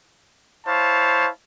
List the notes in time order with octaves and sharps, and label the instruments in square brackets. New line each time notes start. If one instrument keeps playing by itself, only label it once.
[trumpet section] E4 C5 C#5 F5 A5